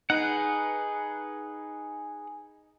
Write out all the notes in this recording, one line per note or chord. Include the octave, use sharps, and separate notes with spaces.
D#4 G#4 B4 F#5